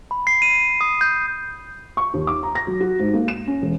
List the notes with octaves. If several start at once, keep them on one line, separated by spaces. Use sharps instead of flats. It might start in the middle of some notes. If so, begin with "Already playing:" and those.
B5
C7
D#7
D#6
G6
C#6
D#2
D6
A#5
A#6
F#3
F#4
G#2
A#3
E7
C#4
E1